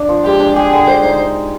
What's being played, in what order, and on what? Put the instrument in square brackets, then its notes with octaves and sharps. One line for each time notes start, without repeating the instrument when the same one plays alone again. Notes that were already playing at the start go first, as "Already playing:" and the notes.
Already playing: [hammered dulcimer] D4
F3
[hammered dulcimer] G#3 [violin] G4
[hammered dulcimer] D4
[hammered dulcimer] G4 [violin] G#4
[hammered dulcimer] D3
[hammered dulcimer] G#3 [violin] C5
[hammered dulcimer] D#4